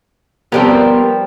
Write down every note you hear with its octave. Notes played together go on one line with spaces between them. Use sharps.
F3 G3 B3 C4 G4 A#4